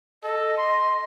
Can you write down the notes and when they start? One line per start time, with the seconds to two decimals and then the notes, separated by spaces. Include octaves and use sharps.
0.23 A4 D#5
0.58 C6